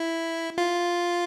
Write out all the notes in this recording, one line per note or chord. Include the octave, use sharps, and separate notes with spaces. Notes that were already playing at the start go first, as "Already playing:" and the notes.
Already playing: E4
F4